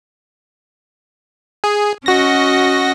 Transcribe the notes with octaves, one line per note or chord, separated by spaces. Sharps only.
G#4
C#4 F#4 D#5 A#6